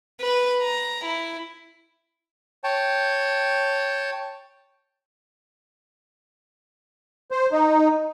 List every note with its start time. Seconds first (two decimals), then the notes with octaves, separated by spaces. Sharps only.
0.21 B4
0.62 A#5
1.05 E4
2.64 C#5 G5 A5
7.31 C5
7.52 D#4